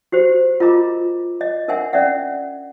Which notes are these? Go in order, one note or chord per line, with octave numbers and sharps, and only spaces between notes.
F#4 G4 C5
F4 A#4 D#5 A#5 D6
D#5
D4 A#4 E5 F#5 G#5
C#4 D5 E5 F#5